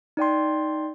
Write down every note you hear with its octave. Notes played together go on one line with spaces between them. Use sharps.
D#4 D5 G5 C6